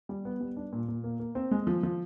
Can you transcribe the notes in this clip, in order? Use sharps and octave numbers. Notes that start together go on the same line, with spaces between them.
G3
B3
G3
D4
A#2
A#2
A#3
A#3
C4
G#3
F3
F3